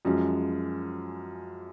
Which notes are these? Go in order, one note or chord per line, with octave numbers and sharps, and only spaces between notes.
F#2 F3 G#3 C#4